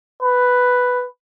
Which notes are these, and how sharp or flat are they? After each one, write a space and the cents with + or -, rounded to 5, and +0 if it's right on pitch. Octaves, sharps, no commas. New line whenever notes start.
B4 +5